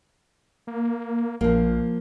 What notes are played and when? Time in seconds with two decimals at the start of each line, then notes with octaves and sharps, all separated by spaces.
0.67 A#3
1.41 A#1 F3 A#3